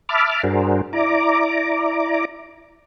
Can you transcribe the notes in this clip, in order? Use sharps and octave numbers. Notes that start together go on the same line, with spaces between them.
E5 A5 B5 D6 F6
G2 D4 F#4 G#4 A#4 C5
E4 D5 A#5 D6